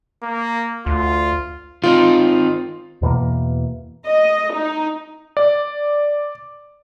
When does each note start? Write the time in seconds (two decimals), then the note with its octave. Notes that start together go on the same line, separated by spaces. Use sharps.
0.23 A#3
0.86 D2 F4
1.83 D#3 C4 D#4 F4
3.02 E2 B2 E3 A#3
4.05 D#5
4.53 D#4
5.37 D5